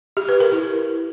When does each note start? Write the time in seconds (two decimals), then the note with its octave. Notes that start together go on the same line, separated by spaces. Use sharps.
0.17 G4
0.29 B4
0.40 A#4
0.52 E4